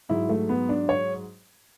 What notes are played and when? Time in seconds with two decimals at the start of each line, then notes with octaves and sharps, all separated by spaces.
0.09 G#2 F#3 E4
0.29 A3
0.49 B3
0.69 D4
0.89 C#5